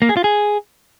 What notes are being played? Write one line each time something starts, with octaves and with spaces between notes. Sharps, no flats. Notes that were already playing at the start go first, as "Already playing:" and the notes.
A#3
G#4
F4
G#4